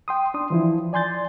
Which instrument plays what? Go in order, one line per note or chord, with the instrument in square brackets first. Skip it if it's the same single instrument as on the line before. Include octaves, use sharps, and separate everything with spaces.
[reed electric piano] G5 C6 D#6
D4 C6 D#6
E3 F3 E4
D5 G#5 C6 G6 A6